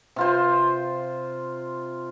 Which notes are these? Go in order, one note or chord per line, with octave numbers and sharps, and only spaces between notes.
C3 F4 C5